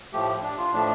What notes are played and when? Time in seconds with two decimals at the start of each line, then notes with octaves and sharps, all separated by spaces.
0.13 A2 F3 A3 G4
0.42 D4
0.58 F4
0.73 A2 F3 A3 D4